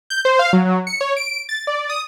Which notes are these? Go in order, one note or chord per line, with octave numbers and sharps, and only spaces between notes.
G6
C5
F5
F#3
F#3
C#7
C#5
D7
A6
D5
D#6